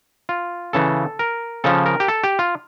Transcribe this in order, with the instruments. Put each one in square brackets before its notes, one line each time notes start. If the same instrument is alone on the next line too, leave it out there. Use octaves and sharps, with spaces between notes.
[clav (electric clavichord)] F4
C#3 E3 A4
A#4
C#3 F3 A4
A#4
G4
A4
G4
F4